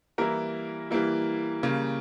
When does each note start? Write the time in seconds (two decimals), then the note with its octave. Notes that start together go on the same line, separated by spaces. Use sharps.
0.18 E3 G3 A#3 E4 A#4
0.91 E3 G3 A#3 E4
1.63 C#3 G3 A#3